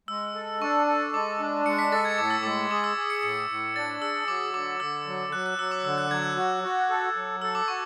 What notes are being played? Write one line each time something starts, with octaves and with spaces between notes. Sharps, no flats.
G#3 E6
A4
D4 C#6
A4
G#3 D6
D4
G#3 C#7
B6
A4 A6
G#6
A2 D6
E6
G#3 D6
G#4 D6
E6
G#4
C#7
A2 C#7
A2
D4 A6
G#4 E6
F#3 D6
D3 D6
D3 E6
F#3
F#3 F#6
F#6
F#3 E6
D6
D3 E6
F#6
F#3 G#6
F#6
F#4
F#4
A4
F#3
A4 E6
D6
F#4 C#6